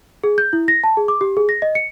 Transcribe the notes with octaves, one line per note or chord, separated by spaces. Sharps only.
G#4
G6
E4
A#6
A5
G#4
D6
G4
G#4
A#6
D#5
C#7